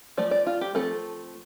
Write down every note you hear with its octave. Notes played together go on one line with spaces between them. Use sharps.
F3 A3 D5
D5
F4
G4
F3 A3 C4 A4